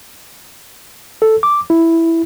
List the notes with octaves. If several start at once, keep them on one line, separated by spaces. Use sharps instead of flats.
A4
D6
E4